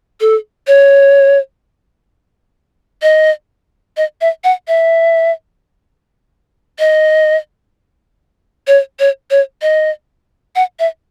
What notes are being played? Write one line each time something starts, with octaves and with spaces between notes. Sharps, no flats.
A4
C#5
D#5
D#5
E5
F#5
E5
D#5
C#5
C#5
C#5
D#5
F#5
E5